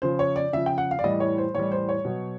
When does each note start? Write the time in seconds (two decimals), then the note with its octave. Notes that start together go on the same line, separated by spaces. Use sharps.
0.02 C#3 F3 C5
0.19 C#5
0.36 D5
0.53 C#3 F3 E5
0.66 G5
0.78 F#5
0.91 F5
0.99 D5
1.04 A2 E3 G3 D#5
1.20 C#5
1.38 C5
1.54 A2 E3 G3 C#5
1.72 C5
1.89 C#5
2.05 B2 F#3